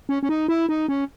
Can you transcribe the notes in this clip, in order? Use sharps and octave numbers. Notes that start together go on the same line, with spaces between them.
C#4
C#4
D#4
E4
D#4
C#4